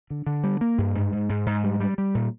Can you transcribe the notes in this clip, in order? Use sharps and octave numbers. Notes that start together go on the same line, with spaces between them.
D3
D3
G3
A#3
G2
G#2
G#2
G#2
G#2
G3
G3
G3
A#2